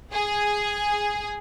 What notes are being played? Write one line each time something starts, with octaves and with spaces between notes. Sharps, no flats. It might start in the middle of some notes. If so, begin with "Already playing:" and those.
G#4